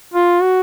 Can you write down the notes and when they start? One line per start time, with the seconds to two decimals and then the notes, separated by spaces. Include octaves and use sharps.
0.14 F4
0.42 F#4